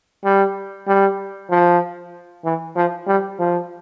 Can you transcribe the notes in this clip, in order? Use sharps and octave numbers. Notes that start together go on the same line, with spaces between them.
G3
G3
F3
E3
F3
G3
F3